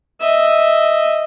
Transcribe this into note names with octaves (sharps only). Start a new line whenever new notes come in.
D#5 E5